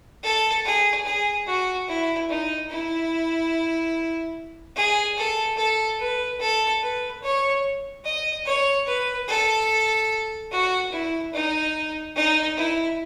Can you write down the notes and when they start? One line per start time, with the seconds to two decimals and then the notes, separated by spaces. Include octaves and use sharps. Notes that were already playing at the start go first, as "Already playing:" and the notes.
0.23 A4
0.65 G#4
1.05 G#4
1.47 F#4
1.88 E4
2.29 D#4
2.70 E4
4.76 G#4
5.17 A4
5.57 A4
5.99 B4
6.40 A4
6.81 B4
7.22 C#5
8.04 D#5
8.45 C#5
8.87 B4
9.28 A4
10.51 F#4
10.92 E4
11.33 D#4
12.15 D#4
12.57 E4